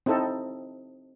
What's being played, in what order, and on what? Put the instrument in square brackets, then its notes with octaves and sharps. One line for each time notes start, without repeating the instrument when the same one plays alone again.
[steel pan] C4 D#4 E4 A4 D#5